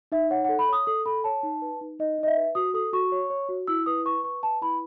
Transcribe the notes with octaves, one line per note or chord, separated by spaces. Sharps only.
D#4 E5
C#5 F#5
A4 F#5
B5
C#5 D#6
A4 D#6
A4 B5
C#5 A5
D#4
B4
D#4
D#4 D#5
D#4
D#5
E5
B4
F#4 D#6
A4 D#6
F#4 C#6
C#5
C#5
F#4
E4 E6
B4 D#6
B4 C#6
B4 C#6
B4 A5
E4 B5